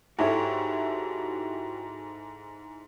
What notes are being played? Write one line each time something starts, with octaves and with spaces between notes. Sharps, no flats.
G#2 E4 F#4 G4 A4 C#5